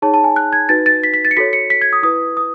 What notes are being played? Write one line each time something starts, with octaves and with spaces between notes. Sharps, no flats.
D#4 G#4 C#5 A5
A5
G#5
F#6
G#6
D#4 F#4 B4 A6
A6
B6
B6
A6
C#7
F#4 A4 C#5 B6
C#7
B6
G#6
D#6
E4 B4 D#6
D#6